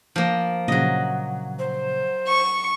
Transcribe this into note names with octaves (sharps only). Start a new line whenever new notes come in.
F3 A#3
A#2 C#3 F3 F#3 D#5
C5
C#6